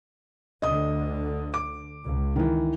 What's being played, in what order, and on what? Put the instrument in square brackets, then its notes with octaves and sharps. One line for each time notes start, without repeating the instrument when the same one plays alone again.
[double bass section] D2 D3 [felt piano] D#5 D#6
[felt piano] D6
[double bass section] C#2
[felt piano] D#3 E3